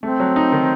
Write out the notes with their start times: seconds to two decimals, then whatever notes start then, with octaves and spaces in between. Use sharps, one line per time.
0.03 A3 C4
0.20 F#3
0.36 D#4
0.52 D#3